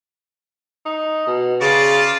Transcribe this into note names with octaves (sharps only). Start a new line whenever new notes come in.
D#4
B2
C#3 F4 D5 A5